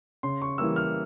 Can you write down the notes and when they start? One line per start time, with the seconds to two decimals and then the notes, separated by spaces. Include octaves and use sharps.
0.23 C#3 C6
0.42 C#6
0.58 E3 G3 A#3 E6
0.76 F6